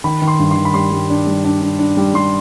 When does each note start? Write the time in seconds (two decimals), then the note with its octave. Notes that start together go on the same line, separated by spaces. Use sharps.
0.04 D#3 B5
0.22 D#3
0.28 C6
0.39 G2
0.51 C6
0.56 D#3
0.65 B5
0.74 G3 C6
0.92 G3
1.10 D4
1.27 G3
1.45 D4
1.62 D4
1.79 D4
1.97 G3
2.14 G3 C6